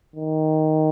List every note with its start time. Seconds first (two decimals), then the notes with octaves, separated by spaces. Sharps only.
0.16 D#3